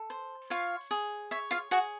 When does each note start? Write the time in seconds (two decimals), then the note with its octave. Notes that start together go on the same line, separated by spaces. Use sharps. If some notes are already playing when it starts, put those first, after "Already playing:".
Already playing: A4
0.10 C5
0.50 F4 C#5 F5
0.91 G#4
1.31 C#5 E5
1.51 F4 F5
1.71 F#4 G#4 F#5